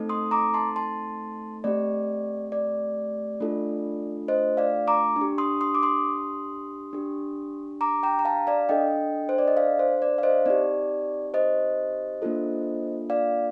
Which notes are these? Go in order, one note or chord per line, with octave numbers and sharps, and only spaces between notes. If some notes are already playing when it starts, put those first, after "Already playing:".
Already playing: A3 C4 D#4 A4
C6 D#6
A#5 D6
A5 C6
A5 C6
A3 C4 G4 D5
D5
A3 D4 F4 A4
C5 D#5
D5 F5
A#5 D6
D4
G4
C6 D#6
C6 D#6
D6
C6 D#6
D4 G4
A#5 D6
G5 A#5
A#5
F5 A5
D5 F5
D4 A4 D#5 G5
C5
D5
D#5
D5 F5
C5
D5
F5
C5 D#5
C4 D#4 G4 D5
C5 D#5
A#3 D4 F4 A4
D5 F5